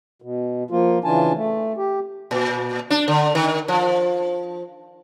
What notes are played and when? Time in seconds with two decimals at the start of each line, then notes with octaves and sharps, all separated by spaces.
0.22 B2
0.71 F3 A#3 F4
1.04 C#3 E3 D4 F4 G#5 A5
1.36 A3
1.77 G4
2.31 A#2
2.90 D4
3.08 D3
3.35 D#3
3.68 F3